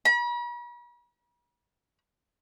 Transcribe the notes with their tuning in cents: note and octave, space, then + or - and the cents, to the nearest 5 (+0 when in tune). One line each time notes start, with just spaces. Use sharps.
B5 -45